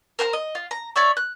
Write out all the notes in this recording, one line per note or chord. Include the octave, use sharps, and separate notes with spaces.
A#4 C5 F#5 A#5
D#5
F4
A#5
C#5 D5 E5 C#6
F#6